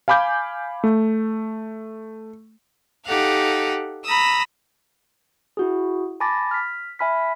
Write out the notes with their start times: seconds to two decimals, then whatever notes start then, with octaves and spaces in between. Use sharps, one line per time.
0.08 F5 G#5 B5 D6 G6
0.84 A3
3.05 D#4 G4 A4 F5 F#5
4.05 A#5 B5 D#6 E6
5.57 E4 F#4 G#4
6.20 G#5 A5 B5 D6 A6 A#6
6.51 F6 B6
6.99 E5 G#5 B5 F6 B6